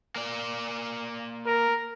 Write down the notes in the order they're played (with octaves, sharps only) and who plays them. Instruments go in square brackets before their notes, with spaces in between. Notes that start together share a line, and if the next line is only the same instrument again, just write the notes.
[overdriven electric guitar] A#3 D5
[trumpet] A#4